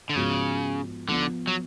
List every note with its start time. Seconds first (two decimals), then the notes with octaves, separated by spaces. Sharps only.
0.10 D3
0.15 G#2 C#3 F3 B3 F#4
1.08 D3 F3 B3 F4
1.47 F#3